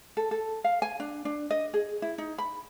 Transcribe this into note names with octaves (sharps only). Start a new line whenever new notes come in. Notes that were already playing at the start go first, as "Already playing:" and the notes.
A4
A4
F5
G#5
D4
D4
D#5
G#4
E4
D#4
B5